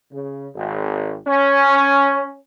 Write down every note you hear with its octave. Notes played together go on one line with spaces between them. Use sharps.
C#3
G#1
C#4